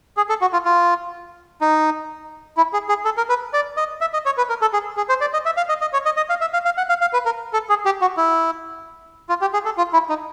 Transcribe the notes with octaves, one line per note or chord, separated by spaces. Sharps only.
G#4
A4
F#4
F4
F4
D#4
E4
G#4
G#4
A4
A#4
B4
D5
D#5
E5
D#5
C#5
B4
A#4
A4
G#4
G#4
C5
D5
D#5
E5
F5
D#5
D#5
C#5
D#5
D#5
F5
E5
F5
F5
F#5
F5
F5
B4
A#4
A4
G#4
G4
F#4
E4
F4
G4
G#4
A4
F4
E4
D#4